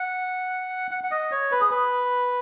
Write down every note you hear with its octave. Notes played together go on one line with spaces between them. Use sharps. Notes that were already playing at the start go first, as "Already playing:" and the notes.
Already playing: F#5
F#5
F#5
D#5
C#5
B4
G#4
B4